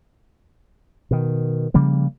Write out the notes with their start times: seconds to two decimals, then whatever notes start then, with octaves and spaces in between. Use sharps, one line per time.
1.11 B2 D#3
1.74 C#3 F3 G3 A#3